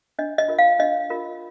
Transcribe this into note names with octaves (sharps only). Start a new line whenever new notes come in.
D4 D#5
D#5
F4 A#4
F5
D4 D#5
F4 A#4